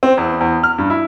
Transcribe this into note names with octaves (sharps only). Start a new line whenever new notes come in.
C4
E2
E2
F6
G2
E4